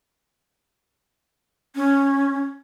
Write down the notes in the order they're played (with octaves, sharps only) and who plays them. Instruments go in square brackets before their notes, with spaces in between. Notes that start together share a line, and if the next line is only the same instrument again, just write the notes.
[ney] C#4